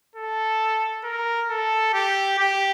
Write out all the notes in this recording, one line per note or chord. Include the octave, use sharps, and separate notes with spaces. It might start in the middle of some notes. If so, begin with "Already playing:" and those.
A4
A#4
A4
G4
G4